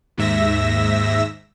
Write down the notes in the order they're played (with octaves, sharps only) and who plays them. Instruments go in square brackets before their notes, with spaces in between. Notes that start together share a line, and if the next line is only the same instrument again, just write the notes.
[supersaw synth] D#2 G#2 E5 E6 A#6